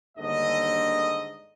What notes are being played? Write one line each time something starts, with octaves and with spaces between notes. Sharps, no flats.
G1 D#2 G#2 D3 D#5